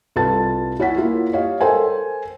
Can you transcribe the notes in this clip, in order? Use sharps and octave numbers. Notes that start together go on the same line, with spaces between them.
C2 F4 A4 B4 A5 A6
E4 C#5 F#5 B6
A#3 E4 F4
G4 C#5 D#5 F5
A4 A#4 C5 G5 G#5